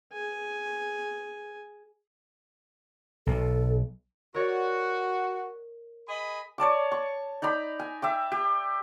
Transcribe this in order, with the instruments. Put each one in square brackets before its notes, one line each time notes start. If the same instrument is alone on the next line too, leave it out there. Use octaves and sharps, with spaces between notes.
[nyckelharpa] G#4 G#5
[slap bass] B1 B2 [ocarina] A4
[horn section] F#4 [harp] A#4 C#5 D5
[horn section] G#4 D#5 B5
[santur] C#5 D5 A5 D6
C#6
D#4 D5 A#5 B5
G#5
E5 G5 D6
G4